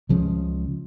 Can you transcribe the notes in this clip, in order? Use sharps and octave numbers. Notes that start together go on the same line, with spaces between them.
C#2 F3 G#3 C#4